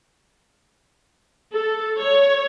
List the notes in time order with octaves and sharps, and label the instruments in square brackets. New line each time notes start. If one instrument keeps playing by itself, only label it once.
[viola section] A4
C#5